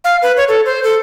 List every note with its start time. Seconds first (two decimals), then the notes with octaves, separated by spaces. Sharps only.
0.04 F5
0.22 B4
0.37 C#5
0.48 A4
0.65 C5
0.83 A4